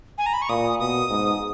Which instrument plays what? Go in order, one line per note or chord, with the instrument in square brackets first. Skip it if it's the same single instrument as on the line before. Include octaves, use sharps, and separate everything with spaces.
[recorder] G#5
A#5
B5
C#6
[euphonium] A#2 [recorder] D#6
[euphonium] B2 [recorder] D#6
[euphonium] G#2